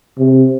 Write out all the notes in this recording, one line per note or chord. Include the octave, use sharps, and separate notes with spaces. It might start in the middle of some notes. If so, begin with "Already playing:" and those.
C3